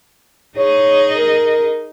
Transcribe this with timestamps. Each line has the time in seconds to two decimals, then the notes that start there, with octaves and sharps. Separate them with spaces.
0.58 D#4 G#4 C#5 D#5
1.17 A#4